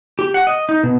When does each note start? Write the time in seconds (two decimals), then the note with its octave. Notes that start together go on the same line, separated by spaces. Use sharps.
0.19 G4
0.34 F#5
0.47 D#5
0.69 D#4
0.83 B2